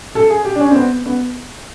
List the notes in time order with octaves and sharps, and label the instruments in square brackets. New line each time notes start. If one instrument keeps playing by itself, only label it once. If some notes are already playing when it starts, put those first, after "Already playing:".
[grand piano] A4
G#4
G4
D4
C#4
C4
B3
B3